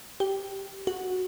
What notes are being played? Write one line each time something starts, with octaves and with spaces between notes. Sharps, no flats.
G4
F#4